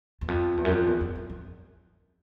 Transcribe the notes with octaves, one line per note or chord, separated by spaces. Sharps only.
E2
F2
E2
F#2
F2
E2
F2
F2
F2